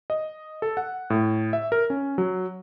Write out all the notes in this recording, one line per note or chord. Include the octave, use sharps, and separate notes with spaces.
D#5
A4
F#5
A2
E5
A#4
C#4
F#3